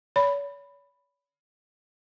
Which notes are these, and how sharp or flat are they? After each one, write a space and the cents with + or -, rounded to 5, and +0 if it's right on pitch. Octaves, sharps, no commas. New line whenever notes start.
C#5 +40 B5 +0